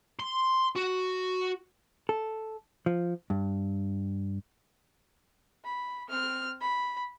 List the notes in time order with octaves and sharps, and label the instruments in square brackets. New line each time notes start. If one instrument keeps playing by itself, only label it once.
[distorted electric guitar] C6
F#4
[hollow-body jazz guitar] A4
F3
G2
[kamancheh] B5
C4 F6
B5